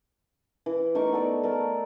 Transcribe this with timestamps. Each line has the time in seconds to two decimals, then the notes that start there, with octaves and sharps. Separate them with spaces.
0.66 E3
0.95 A3 D#4 A#4 C#6
1.12 B3 A4 D5
1.43 A3 A4 A#4